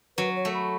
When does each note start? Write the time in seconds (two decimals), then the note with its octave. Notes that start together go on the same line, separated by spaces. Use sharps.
0.17 F#3 B4
0.36 C#5
0.45 A3
0.54 B5